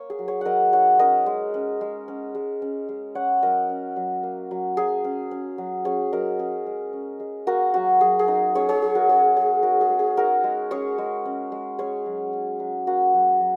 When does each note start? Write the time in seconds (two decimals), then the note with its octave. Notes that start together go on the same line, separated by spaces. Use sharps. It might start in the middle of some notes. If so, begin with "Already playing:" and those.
Already playing: A#3 C#5
0.10 G#4
0.19 F#3
0.28 G#4 C#5
0.41 F#3 A#4 D#5 F#5
0.73 D#4 C#5 F#5
0.99 C#4 A#4 D#5
1.26 G#3
1.54 C#4
1.81 G#3
2.08 C#4
2.35 G#3
2.62 C#4
2.89 G#3
3.15 C#4 C#5 F#5
3.42 F#3 A#4 D#5
3.69 C#4
3.96 F#3
4.23 A#3
4.51 F#3
4.77 F#3 G#4
5.04 C#4
5.31 C#4
5.58 F#3
5.85 C#4 G#4 C#5
6.12 F#3 A#4 D#5
6.39 C#4 G#4
6.66 G#3
6.93 C#4
7.20 G#3
7.47 A#3 F#4 A#4
7.74 F#3 F#4
8.01 F#3 G#4
8.19 G#4
8.28 D#4
8.55 C#4 G#4 C#5
8.69 G#4 C#5
8.82 F#3 G#4
8.95 F#4 A#4
9.09 C#4 G#4 C#5
9.36 F#3 G#4 C#5
9.63 D#4 F#4 A#4
9.81 G#4
9.90 G#3
9.99 G#4
10.16 D#4 F#4 A#4
10.44 G#3
10.71 C#4 G#4 C#5
10.98 G#3
11.25 C#4
11.52 G#3
11.79 C#4 G#4 C#5
12.06 F#3
12.33 C#4
12.60 F#3
12.87 A#3 F#4
13.14 F#3
13.41 F#3